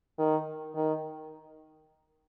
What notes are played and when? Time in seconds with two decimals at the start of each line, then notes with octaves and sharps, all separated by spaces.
0.18 D#3
0.75 D#3